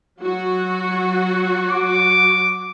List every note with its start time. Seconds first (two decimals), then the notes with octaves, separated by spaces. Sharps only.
0.19 F#3 F#4
1.71 D6